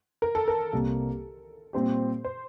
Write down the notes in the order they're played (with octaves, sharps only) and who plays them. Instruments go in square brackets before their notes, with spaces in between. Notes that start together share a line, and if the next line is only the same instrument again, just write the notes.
[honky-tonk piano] A#4
A4
A#4
[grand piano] C2 C3 G3 A#3
[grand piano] A#2 G3 C4 G4 [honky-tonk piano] C5
[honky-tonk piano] C5